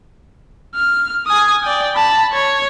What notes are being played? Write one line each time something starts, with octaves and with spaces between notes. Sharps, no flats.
F6
G#5 D#6
D5 G5
A5 B5
C#5